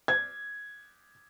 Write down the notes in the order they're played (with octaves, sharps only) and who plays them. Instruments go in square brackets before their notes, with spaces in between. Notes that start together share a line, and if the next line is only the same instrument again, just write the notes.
[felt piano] G#6